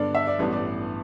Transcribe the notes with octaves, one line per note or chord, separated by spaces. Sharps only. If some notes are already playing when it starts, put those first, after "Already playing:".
Already playing: G2 D3 B3 D4 D5
E5
D5
A1 G2 E3 B3 D4 B4
D5